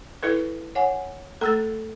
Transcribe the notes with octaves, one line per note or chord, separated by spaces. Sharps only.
E4 A4 B4
C#5 F#5 G#5
A3 A4 A#5 E6 A6